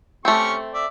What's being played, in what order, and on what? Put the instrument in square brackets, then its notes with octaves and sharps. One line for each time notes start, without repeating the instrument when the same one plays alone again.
[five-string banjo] A3 C4 [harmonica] C#4 G4 C#6
[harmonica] D5 E5